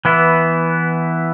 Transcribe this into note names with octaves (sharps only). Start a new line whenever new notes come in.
E3 B3 E4